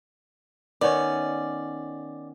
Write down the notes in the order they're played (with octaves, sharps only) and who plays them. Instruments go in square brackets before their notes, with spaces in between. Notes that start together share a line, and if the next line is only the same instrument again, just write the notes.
[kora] D#3 B3 C#4 [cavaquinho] D5